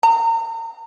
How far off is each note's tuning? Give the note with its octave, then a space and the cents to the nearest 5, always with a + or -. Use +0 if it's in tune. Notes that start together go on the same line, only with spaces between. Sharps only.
A#5 -40